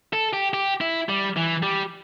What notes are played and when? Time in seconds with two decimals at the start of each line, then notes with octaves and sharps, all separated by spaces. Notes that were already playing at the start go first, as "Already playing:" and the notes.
0.13 A4
0.33 G4
0.54 G4
0.81 E4
1.09 G3
1.36 E3
1.63 G3